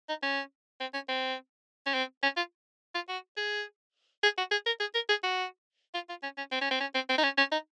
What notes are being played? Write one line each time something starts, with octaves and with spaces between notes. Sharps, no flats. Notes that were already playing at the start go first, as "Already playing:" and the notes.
D#4
C#4
C4
C#4
C4
C#4
C4
C#4
F4
F4
F#4
G#4
G#4
F#4
G#4
A#4
G#4
A#4
G#4
F#4
F4
F4
C#4
C#4
C4
C#4
C4
C#4
C4
C4
D#4
C#4
C#4
D#4